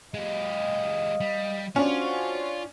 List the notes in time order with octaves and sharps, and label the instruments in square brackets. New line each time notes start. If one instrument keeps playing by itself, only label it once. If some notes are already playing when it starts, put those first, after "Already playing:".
[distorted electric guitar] G#3 G4 [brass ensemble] D#5 F5
[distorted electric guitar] G3
[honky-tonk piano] C#4 D4 [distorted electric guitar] F4 [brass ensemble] F#4 C5